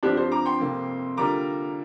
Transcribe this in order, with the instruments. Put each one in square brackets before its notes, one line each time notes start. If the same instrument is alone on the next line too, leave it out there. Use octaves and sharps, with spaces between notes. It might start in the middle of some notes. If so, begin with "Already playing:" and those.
[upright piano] G2 F3 C4 [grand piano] D4 G4
[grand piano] G4 C5
A#5 D6
G5 C6
[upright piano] F2 C3 A#3
[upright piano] D3 G3 A#3 F4 A#4 [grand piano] A#5 D6